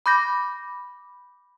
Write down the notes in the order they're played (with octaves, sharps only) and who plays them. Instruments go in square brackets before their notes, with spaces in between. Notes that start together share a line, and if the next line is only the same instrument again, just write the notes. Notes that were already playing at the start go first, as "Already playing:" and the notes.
[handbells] B5 D6 G6 A#6